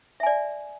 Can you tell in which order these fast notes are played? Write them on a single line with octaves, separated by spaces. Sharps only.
E5 G#5 D5